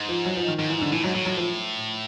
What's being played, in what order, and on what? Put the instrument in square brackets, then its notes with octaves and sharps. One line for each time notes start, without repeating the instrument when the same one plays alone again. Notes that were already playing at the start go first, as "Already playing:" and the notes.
Already playing: [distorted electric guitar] G#2
[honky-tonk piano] F3
F#3
F3
D#3
[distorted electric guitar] G#2 [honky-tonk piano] D#3
[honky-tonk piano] E3
D3
[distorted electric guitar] A2 [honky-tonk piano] E3
[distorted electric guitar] G#2 [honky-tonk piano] F#3
[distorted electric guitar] A2 [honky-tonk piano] F#3
[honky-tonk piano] F#3
F3